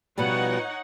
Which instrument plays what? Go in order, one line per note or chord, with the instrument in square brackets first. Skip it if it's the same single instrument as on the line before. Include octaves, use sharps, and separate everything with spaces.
[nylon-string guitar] B2 F3 G3 [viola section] D#4 C#5 F#5